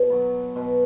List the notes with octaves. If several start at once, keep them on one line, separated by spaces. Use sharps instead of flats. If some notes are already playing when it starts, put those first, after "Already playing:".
Already playing: B2
F#3 B3
B2